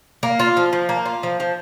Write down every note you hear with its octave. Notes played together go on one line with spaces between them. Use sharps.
A#3
F4
F3
F3
A#3
F4
F3
F3